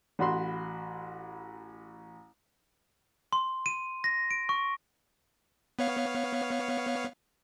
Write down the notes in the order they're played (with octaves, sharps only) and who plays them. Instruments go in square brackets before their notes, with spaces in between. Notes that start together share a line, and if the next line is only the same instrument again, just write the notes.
[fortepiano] A1 F#4 B5 C6
[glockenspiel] C6
D#7
A#6
D7
C#6
[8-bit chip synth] B3 C#5 F5